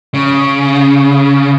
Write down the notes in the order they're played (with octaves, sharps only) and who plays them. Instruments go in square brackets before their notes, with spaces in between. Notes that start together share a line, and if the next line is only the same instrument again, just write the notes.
[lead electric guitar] C#3